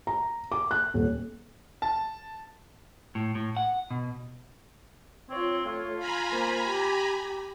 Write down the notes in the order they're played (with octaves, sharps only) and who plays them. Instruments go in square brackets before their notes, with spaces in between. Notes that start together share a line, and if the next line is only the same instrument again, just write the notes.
[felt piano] A#5
D6
F#6
D#1
[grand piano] A5
[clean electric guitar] A2
A2
F#5
B2
[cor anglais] C4 [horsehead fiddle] F4 C#5
[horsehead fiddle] A3 C#5 [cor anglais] F4
[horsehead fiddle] F5 [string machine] G#5 A#5 B5
[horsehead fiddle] A#3 C5
G4